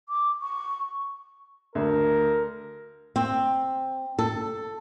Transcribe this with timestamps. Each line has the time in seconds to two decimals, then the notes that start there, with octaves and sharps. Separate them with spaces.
0.09 D6
0.42 C#6
1.75 D2 A#4
3.16 C4
4.19 A4